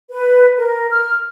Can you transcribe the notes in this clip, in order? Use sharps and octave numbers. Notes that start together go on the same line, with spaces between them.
B4
A#4
F6